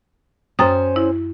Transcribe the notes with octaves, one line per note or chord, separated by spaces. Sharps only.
F#2 C#4 C5 G5 D#6
E4